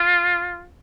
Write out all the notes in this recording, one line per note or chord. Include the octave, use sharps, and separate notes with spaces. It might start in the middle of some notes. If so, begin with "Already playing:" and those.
Already playing: F4